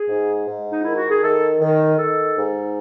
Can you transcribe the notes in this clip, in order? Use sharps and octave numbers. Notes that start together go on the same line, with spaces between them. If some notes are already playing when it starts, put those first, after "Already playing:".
Already playing: G#4
G#2
G#2
D#4
D#3 E4
F#4
G#4
D#3 A4
D#3
D#3 A4
G#2